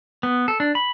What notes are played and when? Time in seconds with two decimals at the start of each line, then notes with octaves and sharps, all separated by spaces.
0.23 B3
0.48 A4
0.60 D4
0.75 B5